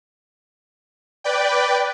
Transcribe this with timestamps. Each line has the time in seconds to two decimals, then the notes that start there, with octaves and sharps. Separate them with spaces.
1.24 B4 D5 G5